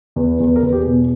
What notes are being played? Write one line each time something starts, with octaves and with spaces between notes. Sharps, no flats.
E2 B4
E2
B4
A#4
E2 B4
G4
G#4
B2